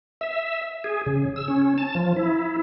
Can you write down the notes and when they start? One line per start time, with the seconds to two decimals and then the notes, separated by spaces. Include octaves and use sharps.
0.21 E5
0.84 G#4
1.06 C#3
1.36 E6
1.48 C#4
1.78 A5
1.95 F3
2.16 E4